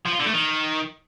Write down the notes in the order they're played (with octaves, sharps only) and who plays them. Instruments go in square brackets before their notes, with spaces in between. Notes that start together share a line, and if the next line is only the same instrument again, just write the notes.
[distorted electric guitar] F3
F4
D3
A3
D#3